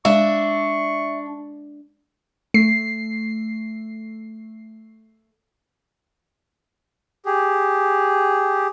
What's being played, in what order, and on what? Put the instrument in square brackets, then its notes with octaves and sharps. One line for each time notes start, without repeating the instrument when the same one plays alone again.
[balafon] G#3 [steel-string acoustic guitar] D4 [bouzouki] E5 [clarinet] C#6
[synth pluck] A3 C7
[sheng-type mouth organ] G4 G#4